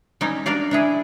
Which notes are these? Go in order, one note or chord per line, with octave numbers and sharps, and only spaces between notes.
G3 C#4 D#4
D4 A#4 D5 F5
D4 E4 G#4